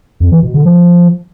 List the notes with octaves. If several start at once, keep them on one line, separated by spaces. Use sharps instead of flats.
F2
E3
B2
D3
F3